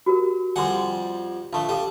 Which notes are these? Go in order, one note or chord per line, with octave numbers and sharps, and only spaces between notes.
F#4 G4 A#4
F2 G3 F#5 G#5 C6
A#1 A3 F5 A5 C#6
G3 A4 F5